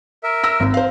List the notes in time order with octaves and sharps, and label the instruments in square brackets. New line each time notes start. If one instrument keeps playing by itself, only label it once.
[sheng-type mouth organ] A#4 E5
[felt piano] E6 A#6
G#1
C5 F5